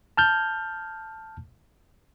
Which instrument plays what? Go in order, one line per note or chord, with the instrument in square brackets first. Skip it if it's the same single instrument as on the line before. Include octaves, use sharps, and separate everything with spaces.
[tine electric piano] A5 F6 G6